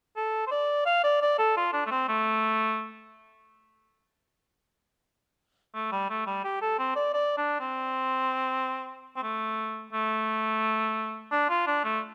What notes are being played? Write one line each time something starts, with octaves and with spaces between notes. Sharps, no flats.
A4
C5
D5
F5
D5
D5
A4
F4
D4
A3
C4
A3
A3
G3
A3
G3
G4
A4
C4
D5
D5
D4
C4
C4
A3
A3
D4
F4
D4
A3